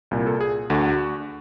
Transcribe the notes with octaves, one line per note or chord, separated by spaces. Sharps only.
C2 A#2
A4
G#4
D2 D3 F#4